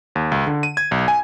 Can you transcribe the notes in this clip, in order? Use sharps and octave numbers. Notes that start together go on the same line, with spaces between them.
D#2
C#2
D3
D#7
G#6
B1
G#5